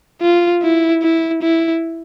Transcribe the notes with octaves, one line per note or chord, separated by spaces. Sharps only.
F4
E4
E4
E4